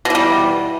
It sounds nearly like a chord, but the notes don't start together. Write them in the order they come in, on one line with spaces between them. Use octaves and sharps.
B2 E3 G3